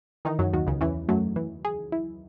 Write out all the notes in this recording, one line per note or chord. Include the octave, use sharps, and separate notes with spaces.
D#3 E3 D#4
F#2 F#3
D#2 D#3 F#4
C#2 C#3
E2 E3 C#4
F#2 F#3 A3
E3
G#4
E4